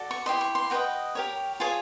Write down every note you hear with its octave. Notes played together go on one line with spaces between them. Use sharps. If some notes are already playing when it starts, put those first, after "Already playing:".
Already playing: F#4 A4 D5
C#6
E4 G4 C5 D#5 C6
C#6
C6
F#4 B4 D#5 G5
G4 A#4 C#5
F4 G#4 C#5 G#5